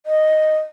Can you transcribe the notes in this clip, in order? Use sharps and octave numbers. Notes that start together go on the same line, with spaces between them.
D#5